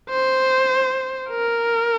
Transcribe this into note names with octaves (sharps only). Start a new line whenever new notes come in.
C5
A#4